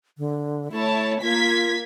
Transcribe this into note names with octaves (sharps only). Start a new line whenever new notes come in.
D3
A3 E4 C#5 A5
A#3 F4 G#6 B6